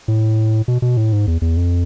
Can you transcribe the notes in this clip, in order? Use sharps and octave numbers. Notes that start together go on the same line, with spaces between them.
A2
B2
B2
A2
G#2
E2
E2
F2